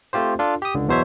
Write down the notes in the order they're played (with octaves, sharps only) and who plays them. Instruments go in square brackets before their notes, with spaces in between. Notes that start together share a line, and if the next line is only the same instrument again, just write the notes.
[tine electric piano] A3 C4 F4 G4 C5
D4 F4 A4
G4 D#6
C#2 D3
E2 B2 F#3 C5 C#5 E5